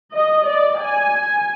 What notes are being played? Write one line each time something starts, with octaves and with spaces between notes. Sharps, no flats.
D#5
D5
G#5